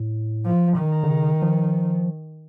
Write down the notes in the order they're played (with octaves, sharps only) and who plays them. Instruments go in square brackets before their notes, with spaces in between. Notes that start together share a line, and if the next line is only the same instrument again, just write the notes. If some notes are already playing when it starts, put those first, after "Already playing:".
Already playing: [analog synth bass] A2
[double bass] F3
D#3
[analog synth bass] D3
C#3
F3